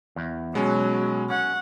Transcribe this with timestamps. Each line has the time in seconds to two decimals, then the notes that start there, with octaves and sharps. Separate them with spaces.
0.16 E2
0.55 B2 F#3 G#3 C#4
1.30 C#4 F#5